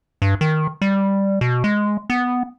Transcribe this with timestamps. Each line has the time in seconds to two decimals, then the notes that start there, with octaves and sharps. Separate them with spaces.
0.22 G2
0.41 D#3
0.82 G3
1.41 B2
1.64 G#3
2.10 B3